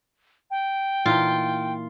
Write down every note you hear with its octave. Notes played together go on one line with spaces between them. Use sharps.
G5
A#2 E3 D#4 F4